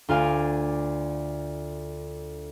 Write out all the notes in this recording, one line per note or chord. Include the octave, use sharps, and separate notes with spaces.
D2 F4 D5 F5 G#5